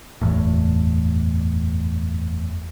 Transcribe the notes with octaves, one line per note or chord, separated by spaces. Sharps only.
F#1 E2 A2